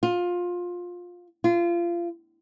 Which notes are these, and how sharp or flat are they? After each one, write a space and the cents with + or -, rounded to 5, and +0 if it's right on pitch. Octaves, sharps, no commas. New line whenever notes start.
F4 +20
F4 -25